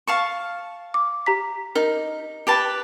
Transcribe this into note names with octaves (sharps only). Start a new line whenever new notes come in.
F5 A5 C#6
D6
G4 A#5 B6
D#4 A#4
G4 B4 A5